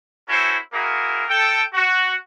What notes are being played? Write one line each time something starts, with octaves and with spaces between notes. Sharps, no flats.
A3 C#4 E4 F#4 A4 C5
A#3 E4 F#4 G#4 A#4
A4 G5
F#4